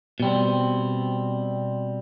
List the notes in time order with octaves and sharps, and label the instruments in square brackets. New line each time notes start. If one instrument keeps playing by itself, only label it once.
[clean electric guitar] B2 G3 C4